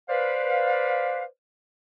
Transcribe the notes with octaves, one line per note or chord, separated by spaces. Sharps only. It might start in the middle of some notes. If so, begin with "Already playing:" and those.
B4 C5 D5 F5